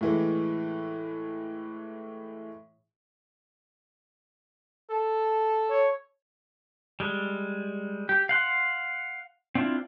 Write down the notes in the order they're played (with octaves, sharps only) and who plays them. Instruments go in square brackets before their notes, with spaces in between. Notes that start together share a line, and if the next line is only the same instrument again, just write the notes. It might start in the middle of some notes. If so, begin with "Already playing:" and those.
[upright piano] A2 E3 G#3
[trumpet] A4
[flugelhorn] C#5
[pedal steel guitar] G3 G#3
G4
F5 F#5 C6
C4 D4 E4 F4